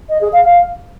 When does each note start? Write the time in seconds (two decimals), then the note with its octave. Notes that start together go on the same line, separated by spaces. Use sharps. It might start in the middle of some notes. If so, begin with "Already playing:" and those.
0.09 D#5
0.21 G#4
0.32 F5
0.44 F5